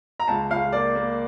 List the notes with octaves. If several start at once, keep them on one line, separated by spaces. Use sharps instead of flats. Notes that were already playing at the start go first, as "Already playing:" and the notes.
A#5
C#2 A5
C#2 F5
A#3 D5
A#3